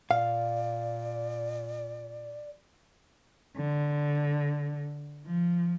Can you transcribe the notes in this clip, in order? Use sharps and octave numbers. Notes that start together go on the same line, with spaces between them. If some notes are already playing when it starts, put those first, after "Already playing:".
A#2 D5 F5
D3
F3